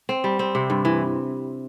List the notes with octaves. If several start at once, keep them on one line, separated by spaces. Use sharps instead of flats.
C4
G3
C4
C3
G2
E3